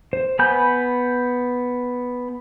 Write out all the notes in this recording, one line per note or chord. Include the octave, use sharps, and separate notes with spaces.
C5
B3 G#5 B5 G6